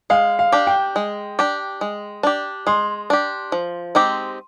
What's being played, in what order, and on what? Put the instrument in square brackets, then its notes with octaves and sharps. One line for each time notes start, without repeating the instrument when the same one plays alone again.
[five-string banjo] G#3 [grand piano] F5
[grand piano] F5
[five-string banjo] D4 G4
[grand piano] G5
[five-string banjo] G#3
D4 G4
G#3
D4 G4
[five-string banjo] G#3 [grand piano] C6
[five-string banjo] D4 G4
F3
G#3 C4 D#4 G4